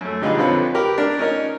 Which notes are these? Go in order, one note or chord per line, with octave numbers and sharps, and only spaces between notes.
F#2 A3
D3 G3 D#4 F4 G#4 B4
F2 D3 F3 C4 B4 C#5
G4 A#4 B4
D4 A#4
C#4 D#4 A#4 C#5